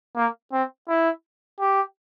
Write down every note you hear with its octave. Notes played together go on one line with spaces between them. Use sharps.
A#3
C4
E4
G4